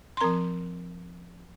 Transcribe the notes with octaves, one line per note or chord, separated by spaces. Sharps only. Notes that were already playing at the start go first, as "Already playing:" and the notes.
C6
F3 C4 A#4 A#5